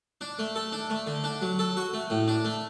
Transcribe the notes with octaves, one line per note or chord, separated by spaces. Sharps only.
D4
A3
A4
D4
A3
D3
D4
F#3
A4
F#4
A3
A2
D4
A3